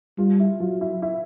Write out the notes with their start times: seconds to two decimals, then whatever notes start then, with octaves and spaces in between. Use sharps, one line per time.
0.18 G3 F4
0.40 E4
0.60 F#3 F4
0.81 E4
1.02 E4